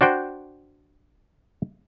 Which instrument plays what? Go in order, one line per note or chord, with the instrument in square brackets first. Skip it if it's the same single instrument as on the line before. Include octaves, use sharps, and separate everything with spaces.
[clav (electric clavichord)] D4 F#4 C5 G5